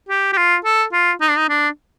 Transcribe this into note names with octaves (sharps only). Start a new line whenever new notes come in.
G4
G4
F4
A4
F4
D#4
D4
D#4
D4